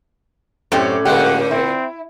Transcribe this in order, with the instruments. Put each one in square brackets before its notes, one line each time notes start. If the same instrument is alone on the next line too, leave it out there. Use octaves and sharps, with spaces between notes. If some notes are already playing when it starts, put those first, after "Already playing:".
[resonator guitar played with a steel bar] F#2 C4 G4 [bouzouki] A2 C#4 D5
[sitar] A#2 D3 [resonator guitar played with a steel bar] G#3 A#3 G4 [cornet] F#5
[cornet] C4 [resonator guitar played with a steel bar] E4